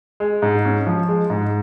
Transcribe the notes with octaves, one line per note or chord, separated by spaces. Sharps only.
G#3
G#2
C#4
F3
G#3
G#2